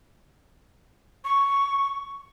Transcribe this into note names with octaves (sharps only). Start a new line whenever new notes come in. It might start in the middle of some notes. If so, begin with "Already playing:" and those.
C#6